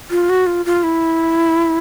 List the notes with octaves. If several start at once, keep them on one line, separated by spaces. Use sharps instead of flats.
F4
F#4
F4
F4
E4